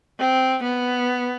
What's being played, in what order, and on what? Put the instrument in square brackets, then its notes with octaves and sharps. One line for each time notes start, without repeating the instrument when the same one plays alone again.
[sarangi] C4
B3